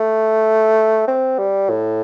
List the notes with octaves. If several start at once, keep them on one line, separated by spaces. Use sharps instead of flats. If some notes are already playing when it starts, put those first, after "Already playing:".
Already playing: A3
C4
G3
A2